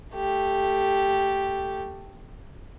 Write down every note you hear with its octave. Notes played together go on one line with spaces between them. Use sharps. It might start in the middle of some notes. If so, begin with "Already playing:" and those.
A3 G4